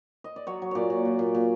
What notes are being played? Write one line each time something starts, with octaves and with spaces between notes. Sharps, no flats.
D#5
D5
F#3 C#5
F#3
A#2 C#5 D5
A#2
A#2
A#2
A#2